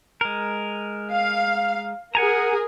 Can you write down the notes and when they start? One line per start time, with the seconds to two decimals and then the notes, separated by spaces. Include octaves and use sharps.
0.21 G#3 A#4
1.09 F5
2.15 G#4 A#4 F#5 G#5 A#5